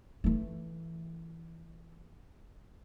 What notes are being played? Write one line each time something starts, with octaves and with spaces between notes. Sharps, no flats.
E3 A3